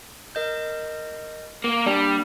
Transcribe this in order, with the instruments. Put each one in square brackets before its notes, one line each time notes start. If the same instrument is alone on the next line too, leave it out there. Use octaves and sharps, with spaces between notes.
[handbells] A#4 D#5 G6
[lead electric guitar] A#3
[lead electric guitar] G3 [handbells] A#3 [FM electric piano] D4